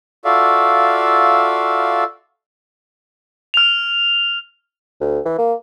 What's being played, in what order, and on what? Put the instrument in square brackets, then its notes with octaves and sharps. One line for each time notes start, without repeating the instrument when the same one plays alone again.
[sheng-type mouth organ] F4 F#4 A4 D5 E5 F5
[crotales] F6 F7
[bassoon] D2
E3
A#3